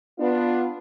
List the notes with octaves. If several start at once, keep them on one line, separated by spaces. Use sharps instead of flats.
B3 D4 F4